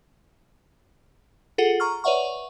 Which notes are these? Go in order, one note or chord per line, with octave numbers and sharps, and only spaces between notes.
F4 G#4 A4 F#5
A#5 C#6 F6
B4 C#5 D5 E5 F#5 C#6